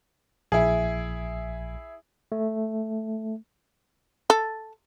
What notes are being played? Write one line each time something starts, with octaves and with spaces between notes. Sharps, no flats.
A#1 E4 G#4
A3
A4